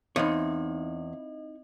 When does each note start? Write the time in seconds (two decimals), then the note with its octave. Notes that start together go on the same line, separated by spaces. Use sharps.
0.16 E2 C4 D#4 C5 C#5 D#5